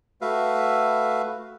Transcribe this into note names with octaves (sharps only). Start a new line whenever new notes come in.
A3 F#4 B4 E5 F5